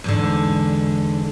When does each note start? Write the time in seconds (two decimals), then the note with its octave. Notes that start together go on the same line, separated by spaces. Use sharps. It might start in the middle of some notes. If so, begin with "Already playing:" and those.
0.04 E2 G#2 D3